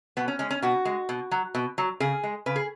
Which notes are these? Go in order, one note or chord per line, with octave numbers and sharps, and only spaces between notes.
B2 B3
C#4
G#3 C#4
C#4
B2 F#4
G#3
B2
F#3
B2
F#3
C#3 G#4
G#3
C#3 B4
G#4